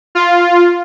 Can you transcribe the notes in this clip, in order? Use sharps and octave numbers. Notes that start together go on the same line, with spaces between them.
F4